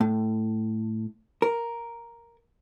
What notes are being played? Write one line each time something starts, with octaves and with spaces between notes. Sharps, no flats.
A2
A#4